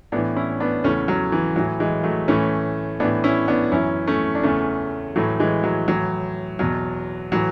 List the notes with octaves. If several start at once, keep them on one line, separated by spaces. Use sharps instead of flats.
A2 E3 B3 D4
C#4 E4
B3 D4
E2 C#3 E3 A3 C#4
F#3
E3
A2 E3 F#3
E3 G#3
F#3 A3
A2 E3 A3 C#4
A2 E3 B3 D4
C#4 E4
B3 D4
F#2 E3 C#4 E4
A3 C#4
D4
E2 C#3 E3 A3 C#4
A2 E3 F#3 A3
E3 G#3
F#3
A2 E3 F#3
E2 B2 F#3
A2 E3 F#3